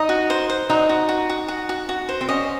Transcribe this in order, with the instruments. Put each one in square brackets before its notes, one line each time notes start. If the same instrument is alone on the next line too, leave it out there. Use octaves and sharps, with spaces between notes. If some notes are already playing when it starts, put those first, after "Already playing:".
Already playing: [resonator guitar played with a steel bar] D#4 [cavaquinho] D#5
[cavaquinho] F#4
C5
C5
[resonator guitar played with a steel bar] D#4 [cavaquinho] F#4
[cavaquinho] F#4
F#4
F#4
F#4
F#4
F#4
C5
[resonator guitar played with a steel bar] C4
[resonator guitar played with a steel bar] C#4 [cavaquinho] D#5